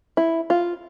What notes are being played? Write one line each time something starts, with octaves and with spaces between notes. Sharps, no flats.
E4
F4